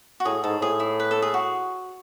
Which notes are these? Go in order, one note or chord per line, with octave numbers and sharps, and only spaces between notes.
F#4
A2 G#4
G#2 A4
A2 G#4
E4
B4
A4
G#4
F#4